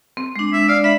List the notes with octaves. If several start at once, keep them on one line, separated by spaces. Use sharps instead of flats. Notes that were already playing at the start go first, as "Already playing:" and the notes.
C4
G#3 D4
E5
D5 F5
E5 B5